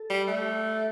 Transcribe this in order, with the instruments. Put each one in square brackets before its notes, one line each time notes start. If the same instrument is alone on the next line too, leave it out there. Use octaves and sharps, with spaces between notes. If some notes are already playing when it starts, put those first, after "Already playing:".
Already playing: [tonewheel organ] A4
[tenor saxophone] G3
A3